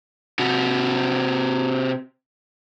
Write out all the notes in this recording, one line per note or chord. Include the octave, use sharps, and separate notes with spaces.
C3 F#4